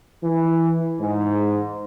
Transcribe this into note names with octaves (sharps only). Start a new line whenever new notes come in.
E3
G#2